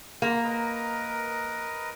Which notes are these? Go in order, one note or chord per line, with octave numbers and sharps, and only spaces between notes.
A#3
A#4 B4 D#5